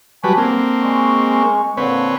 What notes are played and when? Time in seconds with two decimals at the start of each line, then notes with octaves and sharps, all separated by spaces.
0.24 F#3 G3 B4 G#5 A5 C#6
0.38 D3 A#3 C4
0.82 G#3 C#6
1.77 A#2 D3 C4 B4 C#5